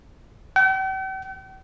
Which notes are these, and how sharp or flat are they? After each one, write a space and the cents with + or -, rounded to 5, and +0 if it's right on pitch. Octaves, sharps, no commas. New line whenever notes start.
G5 -45